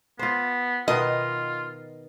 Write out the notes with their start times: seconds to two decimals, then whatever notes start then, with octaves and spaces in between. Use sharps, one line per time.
0.19 B3 F4 C5
0.88 B2 D#3 B3 F4 D#5